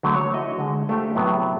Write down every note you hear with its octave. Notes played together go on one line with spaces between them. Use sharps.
D3 F#3 A3
C#5
E4 F#4 D#5
D3 G#3
A3 D4 F4 G4 A4 C5
A2 C3 F#3 B3